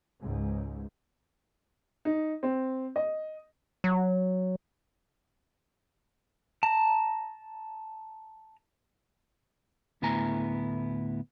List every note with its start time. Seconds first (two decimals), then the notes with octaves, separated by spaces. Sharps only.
0.21 C#2 G#2
2.05 D#4
2.43 C4
2.96 D#5
3.84 F#3
6.63 A5 A#5
10.02 D2 A2 B3 E4 G#5 A#5